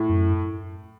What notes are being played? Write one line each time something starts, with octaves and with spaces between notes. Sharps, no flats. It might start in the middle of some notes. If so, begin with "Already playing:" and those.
Already playing: A2
F#2